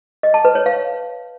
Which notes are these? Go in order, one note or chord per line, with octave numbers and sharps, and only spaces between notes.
D#5
A5
B4
C#5
F5